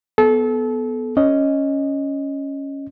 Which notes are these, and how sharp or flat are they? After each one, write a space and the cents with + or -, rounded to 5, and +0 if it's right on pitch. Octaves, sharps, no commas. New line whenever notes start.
B3 +5 A4 -30
C#4 +0 D#5 +0